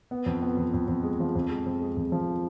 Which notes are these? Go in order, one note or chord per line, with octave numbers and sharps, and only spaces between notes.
B3
F2
B3
F2
F2
F2
G#3
F3
F2
G#3
F2
G#3
F2
F3